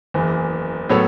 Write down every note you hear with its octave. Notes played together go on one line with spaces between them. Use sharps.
F#1 E2 E3
A2 F#3 B3 A4 C#5